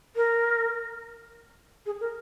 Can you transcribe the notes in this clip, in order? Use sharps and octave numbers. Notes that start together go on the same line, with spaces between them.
A#4
G#4
A#4